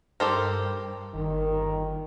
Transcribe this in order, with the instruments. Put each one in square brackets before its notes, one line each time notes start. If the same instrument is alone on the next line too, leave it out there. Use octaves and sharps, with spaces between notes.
[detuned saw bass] G2 [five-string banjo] G4 A4 A#4 [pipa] C5
[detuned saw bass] G1 [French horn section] D#3